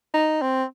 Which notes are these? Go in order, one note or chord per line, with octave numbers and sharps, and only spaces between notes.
D#4
C4